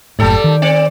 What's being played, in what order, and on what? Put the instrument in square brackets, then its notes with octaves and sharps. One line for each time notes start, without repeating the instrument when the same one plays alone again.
[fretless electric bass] F#1 A2 [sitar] G3 A4 D5
[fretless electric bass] D#3
[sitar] C4 D5